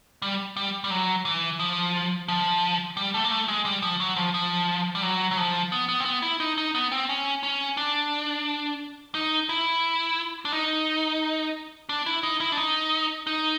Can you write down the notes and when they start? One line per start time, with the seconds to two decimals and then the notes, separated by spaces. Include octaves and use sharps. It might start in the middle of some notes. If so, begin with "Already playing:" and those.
0.22 G3
0.57 G3
0.84 G3
0.91 F#3
1.25 E3
1.59 F3
2.28 F3
2.97 G3
3.14 A3
3.25 A#3
3.31 A3
3.48 G#3
3.65 G3
3.82 F3
4.00 F#3
4.17 F3
4.34 F3
4.95 G3
5.03 F#3
5.31 F#3
5.37 F3
5.72 B3
5.89 B3
6.00 C4
6.05 B3
6.22 E4
6.40 D#4
6.58 D#4
6.75 B3
6.92 C4
7.09 C#4
7.43 C#4
7.77 D4
9.15 D#4
9.49 E4
10.45 D4
10.52 D#4
11.89 D4
12.06 E4
12.23 D#4
12.40 E4
12.52 D4
12.57 D#4
13.27 D#4